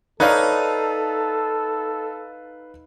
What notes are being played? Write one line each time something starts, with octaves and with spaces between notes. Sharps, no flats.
D#4 A4 B4 C#5 D5 F5 F6